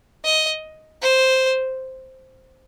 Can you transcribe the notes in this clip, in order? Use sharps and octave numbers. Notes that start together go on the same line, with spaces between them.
D#5
C5